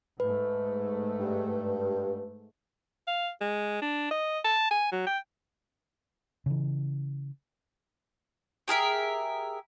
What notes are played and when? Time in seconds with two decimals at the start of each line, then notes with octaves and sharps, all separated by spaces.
0.20 G#2 A3 B4
1.20 G2
3.08 F5
3.41 G#3
3.82 D4
4.11 D#5
4.45 A5
4.71 G#5
4.92 F#3
5.07 G5
6.46 C#3 E3
8.68 G4 G#4 A#4 E5